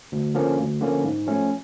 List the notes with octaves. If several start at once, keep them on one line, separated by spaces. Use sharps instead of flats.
D2
D3 F3 A#3 C#4
D2
D3 F3 A#3 C#4
G#2
F3 A3 C#4